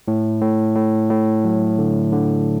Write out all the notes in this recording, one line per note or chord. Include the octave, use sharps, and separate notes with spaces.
A2
A2
A2
A2
F#3
D3
D3